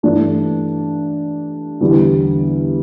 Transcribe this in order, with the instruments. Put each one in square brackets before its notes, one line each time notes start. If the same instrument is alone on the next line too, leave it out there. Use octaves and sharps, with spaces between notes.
[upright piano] G2 E3 A3 D4
E2 D3 G3